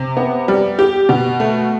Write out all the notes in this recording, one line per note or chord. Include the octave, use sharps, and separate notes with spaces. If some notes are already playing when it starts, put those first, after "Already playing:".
Already playing: C3
B3
G3
G4
B2
A3